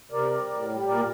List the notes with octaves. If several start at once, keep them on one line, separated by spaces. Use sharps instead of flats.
C3 A#4 D5
G3
A2
G3
A#2 A#4 D5